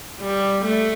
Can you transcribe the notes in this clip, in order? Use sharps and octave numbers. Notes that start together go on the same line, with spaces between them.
G3
A3